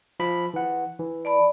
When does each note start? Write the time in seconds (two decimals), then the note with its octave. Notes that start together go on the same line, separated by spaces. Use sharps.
0.20 F3 B5
0.54 E3 F#5
0.99 E3
1.25 D5 A5 B5